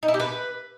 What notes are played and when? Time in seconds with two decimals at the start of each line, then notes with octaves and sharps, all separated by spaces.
0.03 D#4
0.08 E4
0.14 G4
0.20 B4